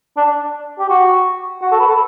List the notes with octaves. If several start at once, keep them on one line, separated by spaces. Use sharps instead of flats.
D4
G4
F#4
F#4
A4
B4
A4